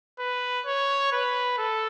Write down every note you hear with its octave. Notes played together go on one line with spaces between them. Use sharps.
B4
C#5
B4
A4